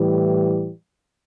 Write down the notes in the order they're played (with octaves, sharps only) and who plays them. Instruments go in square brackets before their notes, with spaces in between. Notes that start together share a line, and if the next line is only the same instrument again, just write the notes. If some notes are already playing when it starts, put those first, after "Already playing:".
Already playing: [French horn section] A2 E3 G3